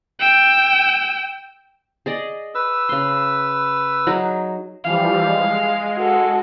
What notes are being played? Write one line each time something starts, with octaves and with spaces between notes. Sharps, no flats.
G5 E6
G#4 D5 D#5
B4 E6
C#3 C6
F#3 D#4 G#4
E3 F3 G3 F5
G#3
F#4 A4